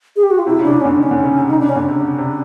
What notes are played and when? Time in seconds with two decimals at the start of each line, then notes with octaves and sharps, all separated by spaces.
0.16 G#4
0.24 G4
0.31 F#4
0.39 F4
0.47 C3 E4
0.59 C#3
0.63 D4
0.73 C#3
0.81 D3 C#4
0.92 D4
0.98 D#3
1.03 C#4
1.11 D3
1.24 C#3
1.37 C3
1.49 C#3 D#4
1.59 C#3 D4
1.69 C#4
1.76 D3 D4
1.89 C3
2.01 C#3
2.18 C3